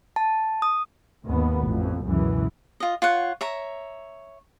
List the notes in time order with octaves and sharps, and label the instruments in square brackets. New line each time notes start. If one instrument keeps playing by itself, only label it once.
[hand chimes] A5
D#6
[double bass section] D#2 G#2 D#3 B3
A1 F2 A2
C#2 F#2 B2 E3 G#3
[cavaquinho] F4 D#5
F4 C#5 F#5
C#5 E5 A#5